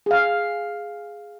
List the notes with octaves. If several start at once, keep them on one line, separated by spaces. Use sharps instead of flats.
G#4 F5